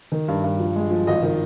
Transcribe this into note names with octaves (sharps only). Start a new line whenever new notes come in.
D#3
G2
G2
F3
G#3
F3
G#1 D#5
D#3